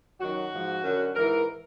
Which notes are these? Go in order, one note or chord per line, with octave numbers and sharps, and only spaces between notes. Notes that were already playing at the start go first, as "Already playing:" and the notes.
F#2 D#3 F#3 F#4
G#2 F3
F#2 D3 F#3
G#2 E3 A#4